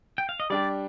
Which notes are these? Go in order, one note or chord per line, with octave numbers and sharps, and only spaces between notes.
G5
F5
D#5
G3 D4 G4 D5